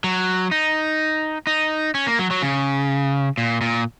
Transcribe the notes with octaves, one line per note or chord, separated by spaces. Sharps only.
F#3
D#4
D#4
C#4
A#3
F#3
F#3
C#3
A#2
A#2